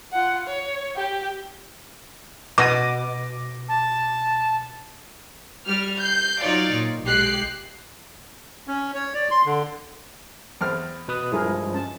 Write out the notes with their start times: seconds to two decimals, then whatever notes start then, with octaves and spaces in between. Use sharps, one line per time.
0.12 F4 F#5
0.47 C#5
0.96 G4 G5
2.58 B2 D6 A#6 D#7
3.69 A5
5.65 G3 F6
5.98 G6 C7
6.41 F#3 D#4 F4 C#5 D5 F5
6.73 A#2
7.05 B1 G#3 G4 F#6 C7
8.68 C#4
8.94 C#5
9.14 D5
9.31 C6
9.46 D3
10.61 E2 C4 F6
11.08 B2 B4 D#6
11.32 G2 F3 G#3 E4 G#4 A#4
11.74 C#4 A5